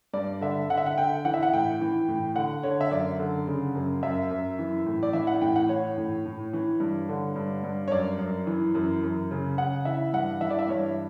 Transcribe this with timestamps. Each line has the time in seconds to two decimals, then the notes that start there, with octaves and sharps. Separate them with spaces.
0.13 G2 D5
0.41 D3 E5
0.69 D3 F#5
0.77 E5
0.86 F#5
0.98 D3 G5
1.25 E3 F#5
1.34 E5
1.43 F#5
1.53 A2 G5
1.81 E3
2.08 A2
2.36 D3 F#5
2.63 D3 C#5
2.81 E5
2.91 F#2 D5
3.19 D3
3.47 C#3
3.75 F#2
4.03 F#2 E5
4.31 F#2
4.59 E3
4.86 A2
5.03 D5
5.13 E3 E5
5.27 F#5
5.41 A2 G5
5.56 F#5
5.69 E3 C#5
5.98 A2
6.26 A2
6.53 E3
6.80 G2
7.09 D3
7.36 G2
7.64 G2
7.88 C#5
7.91 F#2 D5
8.19 F#2
8.47 E3
8.75 F#2
9.03 F#2
9.31 C#3
9.58 C#3 F#5
9.85 E3 E5
10.13 G2 F#5
10.41 E3 E5
10.50 D5
10.59 E5
10.69 G2 C#5